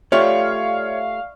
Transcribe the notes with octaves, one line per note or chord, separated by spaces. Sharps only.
A3 F4 G4 C#5 D5 E5 F5 C#6